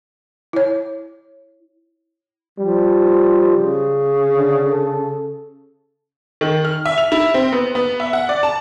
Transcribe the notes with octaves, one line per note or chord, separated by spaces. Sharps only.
E4 C#5
F3 G3
C#3
D3
A4
D#3
F6
E5
F7
E4
C4
B3
B3
E5
F#5
D5
A5